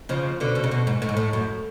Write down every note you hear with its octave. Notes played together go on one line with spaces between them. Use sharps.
C#3 F3
B2 D3
B2 D3
C#3
B2
G#2
A2
G#2
A2
F#2